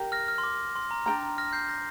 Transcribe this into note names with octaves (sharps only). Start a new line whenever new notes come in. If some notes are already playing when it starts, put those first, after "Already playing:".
Already playing: G4 A#4 G5 A#5
F6 A#6
F6
C6
D6
C6
A#5
D4 A#4 G5 A#5 F6
F6 A#6
G6 C7
F6 A#6